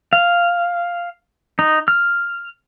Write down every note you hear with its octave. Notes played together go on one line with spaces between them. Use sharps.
F5
D#4
F6